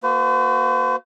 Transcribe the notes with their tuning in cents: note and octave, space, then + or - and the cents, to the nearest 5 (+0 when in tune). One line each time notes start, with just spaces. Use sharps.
A#3 +0 F#4 +0 C5 -45